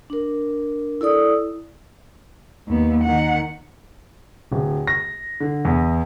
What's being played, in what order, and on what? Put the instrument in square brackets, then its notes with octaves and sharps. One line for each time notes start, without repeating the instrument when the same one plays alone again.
[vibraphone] D4 A#4
E4 A4 D5 D#6
[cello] D#2 B3
D#3 F#5
[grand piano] D1
A#6
D3
E2